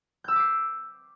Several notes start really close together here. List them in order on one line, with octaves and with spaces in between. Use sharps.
G6 E6 B6 D6 C7